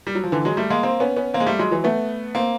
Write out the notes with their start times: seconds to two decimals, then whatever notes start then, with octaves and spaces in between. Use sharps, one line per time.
0.07 G3
0.15 F#3
0.24 F3
0.32 D3 E3
0.45 F#3 G#3
0.57 G3 A3
0.70 G#3 A#3
0.83 A#3 C4
1.00 B3 C#4
1.16 B3 C#4
1.34 A#3 C4
1.40 G#3
1.46 G3 A3
1.59 F#3 G#3
1.71 E3 F#3
1.84 A3 B3
2.35 A#3 C4